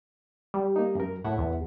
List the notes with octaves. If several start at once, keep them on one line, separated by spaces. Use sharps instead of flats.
G3
A#3 D#4
F#2 A#4
A2 E4 E5 F#5
E2